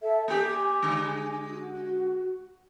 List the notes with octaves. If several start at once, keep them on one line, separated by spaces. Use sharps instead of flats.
A4 E5
A#3 G4 G#5
D3 G#3
F#4